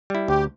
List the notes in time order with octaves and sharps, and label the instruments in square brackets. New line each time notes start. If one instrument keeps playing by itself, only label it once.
[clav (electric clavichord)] G3 E4
[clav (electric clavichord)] D2 [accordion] G4